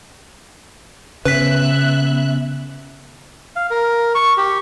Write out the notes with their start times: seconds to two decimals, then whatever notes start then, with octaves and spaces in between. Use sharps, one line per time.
1.25 C#3 B3 B4 E5 F#6 B6
3.56 F5
3.71 A#4
4.15 C#6
4.37 G4